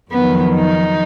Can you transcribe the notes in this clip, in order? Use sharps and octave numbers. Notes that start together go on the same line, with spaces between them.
F2 D#3 F#3 B3
D#4